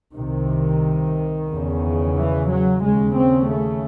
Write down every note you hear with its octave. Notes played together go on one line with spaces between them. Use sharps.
C2 C3 D#3
E2 C#3
E3
F#3
D#2 C#3 G#3
C4
A3